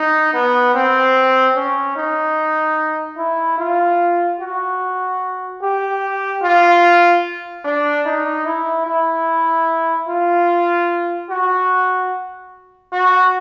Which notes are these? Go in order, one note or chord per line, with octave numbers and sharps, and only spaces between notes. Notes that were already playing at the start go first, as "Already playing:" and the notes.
Already playing: D#4
B3
C4
C#4
D#4
E4
F4
F#4
G4
F4
D4
D#4
E4
E4
F4
F#4
F#4